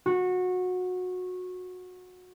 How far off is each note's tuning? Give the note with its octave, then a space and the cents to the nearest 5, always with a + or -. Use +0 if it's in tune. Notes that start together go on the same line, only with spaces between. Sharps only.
F#4 -20